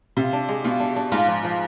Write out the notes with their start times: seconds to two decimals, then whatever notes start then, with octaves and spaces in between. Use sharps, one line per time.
0.17 C3 F4
0.33 D4
0.48 G#3
0.64 B2 F4
0.80 D4
0.96 D4
1.12 G#2 F4
1.28 F3
1.44 F3